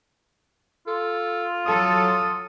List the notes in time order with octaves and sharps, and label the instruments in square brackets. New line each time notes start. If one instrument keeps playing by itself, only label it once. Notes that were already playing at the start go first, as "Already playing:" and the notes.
[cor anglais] F4 [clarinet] A4
[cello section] F#3 A4 [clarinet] D#6